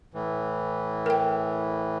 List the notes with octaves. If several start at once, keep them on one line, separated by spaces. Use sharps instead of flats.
A2 E3
A#4 G5